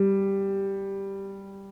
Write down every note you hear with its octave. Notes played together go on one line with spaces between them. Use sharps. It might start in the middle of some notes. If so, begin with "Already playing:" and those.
Already playing: G3